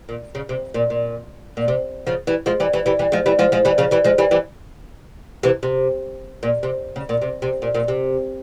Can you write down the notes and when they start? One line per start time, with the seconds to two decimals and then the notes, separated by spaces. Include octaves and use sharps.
0.09 A#2
0.35 C#3
0.49 C3
0.74 A#2
0.90 A#2
1.57 A#2
1.68 C3
2.07 C#3 F3
2.27 E3 G3
2.46 F3 G#3
2.60 E3 G3
2.73 E3 G3
2.86 E3 G3
2.99 E3 G3
3.12 F3 G#3
3.26 E3 G3
3.39 F3 G#3
3.52 F3 G#3
3.65 E3 G3
3.78 C#3 F3
3.91 E3 G3
4.04 F3 G#3
4.18 E3 G3
4.31 E3 G3
5.43 C3 E3
5.63 C3
6.43 A#2
6.63 C3
6.96 C#3
7.09 A#2
7.22 C3
7.42 C3
7.62 A#2
7.75 A#2
7.88 C3